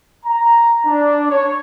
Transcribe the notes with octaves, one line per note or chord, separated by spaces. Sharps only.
A#5
D4
C#5